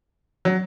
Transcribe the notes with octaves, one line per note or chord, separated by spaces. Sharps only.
F#3